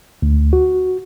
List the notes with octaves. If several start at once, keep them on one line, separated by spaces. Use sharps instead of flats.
D2
F#4